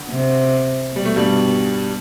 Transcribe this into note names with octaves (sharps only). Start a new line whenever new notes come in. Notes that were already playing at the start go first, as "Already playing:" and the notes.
Already playing: D2 D3
C3
B2 G3
A3
G2 G3